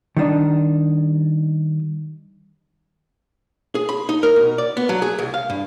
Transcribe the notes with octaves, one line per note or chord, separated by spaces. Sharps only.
D#3 G3 D4 D#4
G#4
B5
D#4
A#4
B2
D5
B3
F#3
G#4
C2
F5
G2